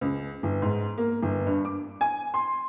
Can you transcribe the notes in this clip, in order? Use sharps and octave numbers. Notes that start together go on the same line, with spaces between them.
C#2
G1
G#2
A#3
G1
G2
D6
G#5
C6